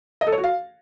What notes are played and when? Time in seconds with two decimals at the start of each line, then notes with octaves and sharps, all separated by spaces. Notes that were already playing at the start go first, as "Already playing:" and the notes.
0.21 D#5
0.27 A4
0.32 C#5
0.38 F#4
0.44 F5